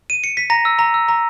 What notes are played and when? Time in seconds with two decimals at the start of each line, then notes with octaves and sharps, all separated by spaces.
0.10 D#7
0.24 C#7
0.37 B6
0.50 A#5 A#6
0.65 E6
0.79 A#5
0.94 E6
1.08 A#5